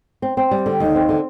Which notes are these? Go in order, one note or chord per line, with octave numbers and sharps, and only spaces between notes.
C4
C4
G3
D3
D#2
C4
D3